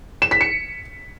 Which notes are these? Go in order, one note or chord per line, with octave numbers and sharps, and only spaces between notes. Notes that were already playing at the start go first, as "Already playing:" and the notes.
E7
B6
C#7